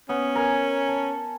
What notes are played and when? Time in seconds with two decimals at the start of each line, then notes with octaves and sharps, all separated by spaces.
0.09 B3 C#4
0.35 A#4 G#5
0.89 A5